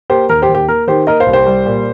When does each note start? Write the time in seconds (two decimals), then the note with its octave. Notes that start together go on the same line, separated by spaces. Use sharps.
0.10 A#3 G4 C5
0.29 D#2 A#4
0.42 G4 C5
0.49 D#2
0.55 G4
0.68 A#3 A#4
0.87 D#3 G4 C5
1.07 A#3 A#4 D#5
1.20 C5 F5
1.26 C2
1.33 G4 C5
1.46 G3
1.66 A#2